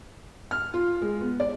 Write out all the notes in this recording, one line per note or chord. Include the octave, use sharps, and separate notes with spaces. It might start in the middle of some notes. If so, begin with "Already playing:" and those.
F6
F4
G#3
B3
D5